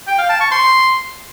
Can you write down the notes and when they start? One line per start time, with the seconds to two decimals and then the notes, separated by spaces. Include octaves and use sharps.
0.07 G5
0.18 F5
0.29 A5
0.40 C#6
0.51 C6